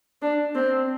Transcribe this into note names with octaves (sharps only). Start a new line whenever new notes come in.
D4
C4